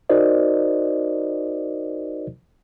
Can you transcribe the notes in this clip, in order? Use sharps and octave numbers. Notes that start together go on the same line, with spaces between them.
D#4 F#4 A#4 C5 D5 D#5